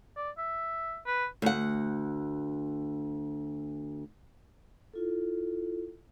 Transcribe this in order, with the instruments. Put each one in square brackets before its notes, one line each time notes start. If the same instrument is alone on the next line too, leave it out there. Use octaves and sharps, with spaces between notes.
[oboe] D5
E5
B4
[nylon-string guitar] D2 F#5
[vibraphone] E4 F4 A4